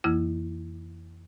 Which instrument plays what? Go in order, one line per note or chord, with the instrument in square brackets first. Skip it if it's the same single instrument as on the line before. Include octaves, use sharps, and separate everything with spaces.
[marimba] F2 E3 A#3 E4 E6